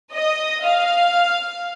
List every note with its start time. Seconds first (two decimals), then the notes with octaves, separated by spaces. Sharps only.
0.12 D#5
0.63 F5